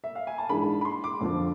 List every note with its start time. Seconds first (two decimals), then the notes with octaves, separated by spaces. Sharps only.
0.04 E5
0.15 F5
0.27 G#5
0.38 A5
0.49 G#2 E3 G#3 D4 B5
0.81 B5
0.85 C6
1.04 D6
1.21 F2 D3 F3